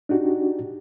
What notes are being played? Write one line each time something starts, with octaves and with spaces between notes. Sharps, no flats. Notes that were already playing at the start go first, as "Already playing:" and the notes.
D4 D#4 F#4 G4